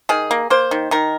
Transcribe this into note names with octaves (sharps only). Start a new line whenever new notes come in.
D#3 G#4
A#3
A#3 C5
D#3
D#3 A#4